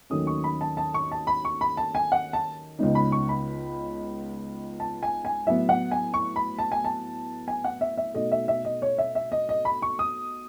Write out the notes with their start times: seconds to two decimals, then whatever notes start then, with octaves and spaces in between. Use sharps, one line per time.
0.10 D#2 D#3 F#3 A3 C#4 D#6
0.27 C#6
0.44 B5
0.61 A5
0.77 A5
0.94 C#6
1.12 A5
1.27 B5
1.45 C#6
1.61 B5
1.77 A5
1.95 G#5
2.12 F#5
2.33 A5
2.79 C#2 C#3 G#3 B3 D#4
2.95 B5
3.12 C#6
3.29 B5
4.80 A5
5.03 G#5
5.25 G#5
5.47 A2 F#3 B3 E5
5.69 F#5
5.91 G#5
6.14 C#6
6.36 B5
6.59 A5
6.72 G#5
6.84 A5
7.48 G#5
7.64 F#5
7.81 E5
7.97 E5
8.14 B2 A3 D#4 D#5
8.32 E5
8.48 E5
8.65 D#5
8.82 C#5
8.98 E5
9.15 E5
9.32 D#5
9.49 D#5
9.65 B5
9.82 C#6
9.99 D#6